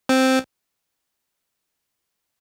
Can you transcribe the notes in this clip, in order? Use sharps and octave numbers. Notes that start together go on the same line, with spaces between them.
C4